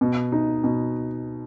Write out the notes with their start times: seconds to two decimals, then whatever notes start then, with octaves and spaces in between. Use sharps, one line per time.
0.01 B2
0.32 D#4
0.64 B2